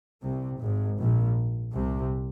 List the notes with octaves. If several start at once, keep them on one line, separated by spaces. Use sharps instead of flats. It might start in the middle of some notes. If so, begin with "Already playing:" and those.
C2 C3
G#1 G#2
A#1 A#2
C2 C3